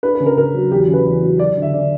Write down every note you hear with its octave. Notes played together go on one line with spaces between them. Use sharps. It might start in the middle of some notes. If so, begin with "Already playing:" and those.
D4 B4
B4
C#3
A#4
C#3 A#4
F#3
E2 G4
C#3
B4
E2
F#3
F#3 D5
D3
E5
D3 D5